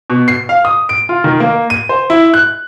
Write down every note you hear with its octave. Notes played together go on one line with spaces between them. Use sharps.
B2
C7
F5
D#6
D7
F4
D#3
A#3
D#7
C5
E4
F#6